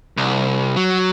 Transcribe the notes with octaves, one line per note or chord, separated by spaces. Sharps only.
C2
F#3